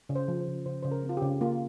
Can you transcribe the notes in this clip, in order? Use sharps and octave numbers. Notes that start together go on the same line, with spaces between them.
C#3
C5
F3
C5
C#3
C#3 C5
C#3 C5
A#4
C4
F4
G4
C#3
A#3 F4